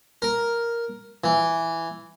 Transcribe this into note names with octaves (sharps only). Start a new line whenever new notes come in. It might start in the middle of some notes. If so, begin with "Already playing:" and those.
A#4
E3